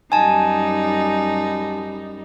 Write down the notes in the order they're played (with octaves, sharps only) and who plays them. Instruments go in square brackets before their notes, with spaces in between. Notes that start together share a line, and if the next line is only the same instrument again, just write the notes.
[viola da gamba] F#2 G3 D#4 [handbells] G#5 A5